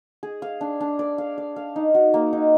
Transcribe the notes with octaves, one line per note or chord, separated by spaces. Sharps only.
G#4
F5
D4
D4
D5
F5
D5
F5
D#4
F#4
A#3
D#4